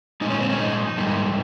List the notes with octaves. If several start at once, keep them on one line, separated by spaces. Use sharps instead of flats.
A#2 F3 G#3 D#4
C#4
C4
C#4
D#4
G#2 G3 A#3